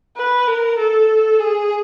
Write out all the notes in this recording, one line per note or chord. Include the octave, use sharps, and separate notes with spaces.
B4
A#4
A4
G#4